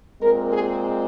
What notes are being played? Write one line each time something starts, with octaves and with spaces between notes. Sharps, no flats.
A#2 G#3 C4 A#4
G#4